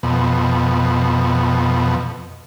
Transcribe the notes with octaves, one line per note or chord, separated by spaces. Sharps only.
F2 B2